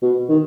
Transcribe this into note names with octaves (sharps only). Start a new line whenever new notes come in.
B2
D#3